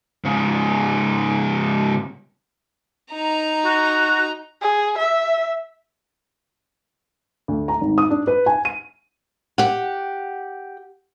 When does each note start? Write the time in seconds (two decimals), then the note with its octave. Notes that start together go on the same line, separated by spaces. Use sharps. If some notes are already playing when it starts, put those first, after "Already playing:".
0.24 G#2 C#3
3.13 D#4 A#5
3.65 F#4
4.62 G#4
4.98 E5
7.48 D2
7.68 A#5
7.81 G#1
7.98 D#6
8.10 D4
8.27 B4
8.46 G#5
8.65 D#7
9.58 G4 F#5